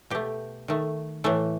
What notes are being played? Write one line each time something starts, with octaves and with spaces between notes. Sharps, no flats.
B2 A3 G4
D#3 A3
A2 E3 A3